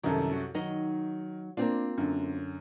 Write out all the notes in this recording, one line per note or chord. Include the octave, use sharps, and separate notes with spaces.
C2 F#2 D#3 A4
F#4
D#3 F#3 D#4 D#5
A#3 C4 D4 F4
F#2 D3